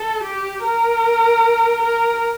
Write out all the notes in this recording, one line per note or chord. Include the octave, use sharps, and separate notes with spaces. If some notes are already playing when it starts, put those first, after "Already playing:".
Already playing: A4
G4
A#4
A#4